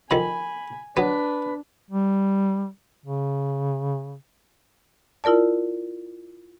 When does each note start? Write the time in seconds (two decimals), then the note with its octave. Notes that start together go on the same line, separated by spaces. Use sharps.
0.11 D2 D#3 F3 G#5 B5
0.97 F#3 B3 D4 B4
1.91 G3
3.06 C#3
5.24 E4 F4 A#4 D5 A5